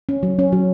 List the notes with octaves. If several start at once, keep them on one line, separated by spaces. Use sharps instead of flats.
C#4
F#3
C#4
F#3